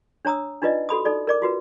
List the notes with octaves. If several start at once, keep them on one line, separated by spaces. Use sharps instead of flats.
D4 C#5 A#5 D#6 E6
D4 D#4 F4 B4 D5 D#5
F#4 A4 B5 D#6
D#4 A4 D5
A#4 D5 D6
F4 F#4 B4